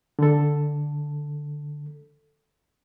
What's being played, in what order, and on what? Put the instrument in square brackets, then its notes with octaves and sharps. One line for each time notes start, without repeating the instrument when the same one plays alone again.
[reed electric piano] D3 A4